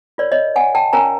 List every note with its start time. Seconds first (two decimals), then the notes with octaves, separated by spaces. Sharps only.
0.18 F4 A#4 C#5 D5
0.32 C#5 D#5
0.56 F#5 G#5
0.75 G5 A5
0.93 C#4 F4 A#4 C#5 G#5 A#5